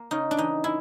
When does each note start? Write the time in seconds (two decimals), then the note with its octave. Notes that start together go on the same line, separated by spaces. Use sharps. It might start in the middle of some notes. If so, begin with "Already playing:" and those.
Already playing: A#3
0.11 C#3 D#4
0.31 D4
0.37 E3 D#4
0.64 G#3 E4